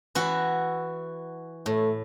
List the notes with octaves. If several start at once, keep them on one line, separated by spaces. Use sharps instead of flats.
E3 E4 F#4
A2 A3